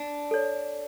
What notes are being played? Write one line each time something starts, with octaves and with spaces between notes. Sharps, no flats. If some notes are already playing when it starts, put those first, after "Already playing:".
Already playing: D4
A4 C#5